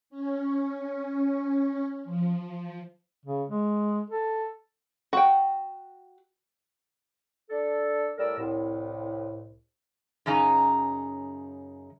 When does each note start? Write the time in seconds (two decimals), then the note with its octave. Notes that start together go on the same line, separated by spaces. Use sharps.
0.10 C#4
2.04 F3
3.25 C#3
3.48 G#3
4.10 A4
5.13 F#4 G5
7.50 D4 A4
8.18 A2 G3 A#4 D5 E6
8.38 C2 A2
10.26 F#2 C#3 D#4 A#5